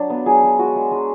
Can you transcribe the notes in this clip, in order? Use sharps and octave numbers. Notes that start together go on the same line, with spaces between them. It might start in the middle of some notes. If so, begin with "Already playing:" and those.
Already playing: F#3 D4
B3
F#3 G#4
F#3
G#3 F#4
G#3
G#3